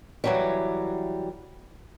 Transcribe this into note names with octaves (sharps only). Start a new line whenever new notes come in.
E3 F#3 G3